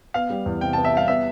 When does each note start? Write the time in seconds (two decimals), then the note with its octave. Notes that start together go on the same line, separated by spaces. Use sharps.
0.14 B3 F5
0.30 G3
0.46 E2
0.61 C3 G5
0.73 A5
0.78 B3
0.85 E5
0.93 G3 F5
1.08 B3 E5